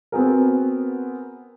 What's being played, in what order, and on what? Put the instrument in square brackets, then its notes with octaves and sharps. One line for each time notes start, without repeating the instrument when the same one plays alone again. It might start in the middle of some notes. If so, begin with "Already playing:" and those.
[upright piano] B3 C4 F#4 G#4 A#4